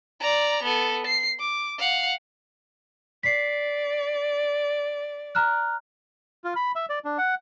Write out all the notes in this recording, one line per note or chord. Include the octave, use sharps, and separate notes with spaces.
D5 A#5
B3 A4
C7
D6
F5 F#5
D5 B6 C7
A#5 F6 F#6
F4
B5
E5
D5
D4
F#5